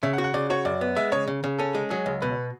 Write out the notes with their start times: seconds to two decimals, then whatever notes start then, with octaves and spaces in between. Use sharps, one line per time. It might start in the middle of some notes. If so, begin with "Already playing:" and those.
0.03 C#3 E5
0.13 F#5
0.18 F#4
0.24 F#5
0.34 C#3 D5
0.50 F#4 C#5
0.65 F#2 D5
0.81 B3
0.96 G#3 E5
1.12 C#3 C#5
1.28 C#3
1.44 C#3
1.59 C#4 A4
1.75 G#3
1.90 F#3 G#4
2.06 C#2
2.22 B2 B4